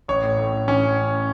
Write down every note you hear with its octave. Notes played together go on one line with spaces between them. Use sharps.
A1 C#5
A2
A2
A1
A1 C#4